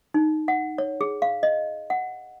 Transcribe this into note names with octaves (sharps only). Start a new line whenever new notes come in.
D#4
F#5
C#5
G#4
F5
D#5
F#5